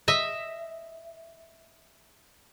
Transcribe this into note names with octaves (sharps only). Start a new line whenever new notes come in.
D#5 E5